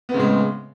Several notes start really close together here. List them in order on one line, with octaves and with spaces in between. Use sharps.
B3 C4 C#3 A2 G#3